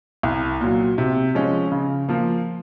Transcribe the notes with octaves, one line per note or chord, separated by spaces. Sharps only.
C2
A#2 F#3
C3
F3 G#3 C#4
C#3
F3 A#3